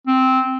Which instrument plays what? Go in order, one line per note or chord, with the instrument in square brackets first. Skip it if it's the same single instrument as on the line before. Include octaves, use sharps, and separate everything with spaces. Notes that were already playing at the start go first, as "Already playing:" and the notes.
[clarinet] C4